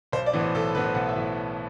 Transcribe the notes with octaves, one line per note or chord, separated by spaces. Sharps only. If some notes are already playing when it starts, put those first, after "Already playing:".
B1 C5
D5
A2 E3 B3
C5
B1 A4
A2 E3 B3 B4
C5
B1 F#5
E5
A2 E3